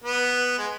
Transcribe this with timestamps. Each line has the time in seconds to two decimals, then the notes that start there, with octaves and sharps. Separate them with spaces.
0.04 B3
0.59 G#3